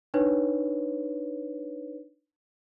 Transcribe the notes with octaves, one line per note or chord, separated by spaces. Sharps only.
D4 D#4 B4 C#5